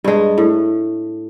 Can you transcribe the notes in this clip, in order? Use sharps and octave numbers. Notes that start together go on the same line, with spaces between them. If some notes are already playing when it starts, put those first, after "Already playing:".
G2 G#3
A2